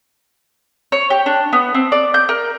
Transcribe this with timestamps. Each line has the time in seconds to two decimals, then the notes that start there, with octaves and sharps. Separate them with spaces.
0.92 C#5
1.10 G4
1.26 D4
1.53 B3
1.74 C4
1.92 D5
2.14 G6
2.29 A#4